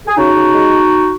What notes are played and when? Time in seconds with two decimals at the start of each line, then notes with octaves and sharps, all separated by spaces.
0.07 G#4
0.17 C#3 D#4 F#4
0.36 C#3
0.54 G#3